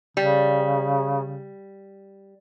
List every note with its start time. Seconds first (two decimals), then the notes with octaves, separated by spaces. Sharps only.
0.17 C#3 G3